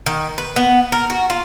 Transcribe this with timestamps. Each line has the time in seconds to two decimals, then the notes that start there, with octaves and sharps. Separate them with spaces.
0.06 D#3
0.38 B4
0.56 B3
0.92 A#4
1.10 F#4
1.30 F4